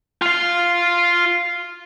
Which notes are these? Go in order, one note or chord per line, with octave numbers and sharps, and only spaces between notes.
F4 F5